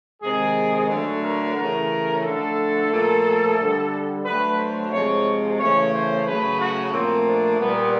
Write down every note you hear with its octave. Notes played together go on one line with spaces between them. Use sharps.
C3 D#3 G#3 G#4
D3 F#3 A3 A4
A#4
C#3 E3 A3 A#4
D3 F3 A3 A4
A#2 F3 A3
D3 G3
D3 F#3 A3 B4
C5
C3 F3 G#3 C#5
C#3 E3 A3 C#5
C5
C#3 F#3 A3 B4
F#4
A#2 F3 A3 C4
D4
A#2 G3 B3